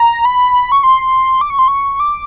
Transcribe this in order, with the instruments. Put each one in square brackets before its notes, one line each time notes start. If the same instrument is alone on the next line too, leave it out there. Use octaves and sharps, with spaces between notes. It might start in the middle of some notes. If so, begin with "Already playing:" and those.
Already playing: [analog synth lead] A#5
B5
C#6
C6
D6
C#6
C6
C#6
D6